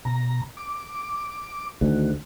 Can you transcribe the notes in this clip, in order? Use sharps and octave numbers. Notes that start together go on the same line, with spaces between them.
B2 A#5
D6
D2 D#3 F#4